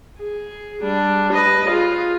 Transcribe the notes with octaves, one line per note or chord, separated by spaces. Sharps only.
G#4
G3 D4
B4 D#5
F4 G#4